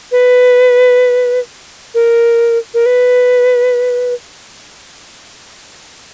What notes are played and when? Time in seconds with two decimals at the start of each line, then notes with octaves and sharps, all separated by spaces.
0.12 B4
1.94 A#4
2.74 A#4
2.86 B4